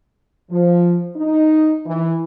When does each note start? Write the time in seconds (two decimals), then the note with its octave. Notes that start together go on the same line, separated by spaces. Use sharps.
0.50 F3
1.16 D#4
1.86 E3